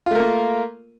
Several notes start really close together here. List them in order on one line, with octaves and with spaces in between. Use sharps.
F4 A3 A#4 A#3